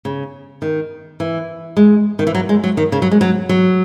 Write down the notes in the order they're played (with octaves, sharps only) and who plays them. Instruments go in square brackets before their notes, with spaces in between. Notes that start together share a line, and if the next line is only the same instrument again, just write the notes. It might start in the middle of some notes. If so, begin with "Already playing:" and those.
[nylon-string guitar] C#3
D#3
E3
G#3
D#3
E3
F#3
G#3
F#3
D#3
C#3
F#3
G#3
F#3
F#3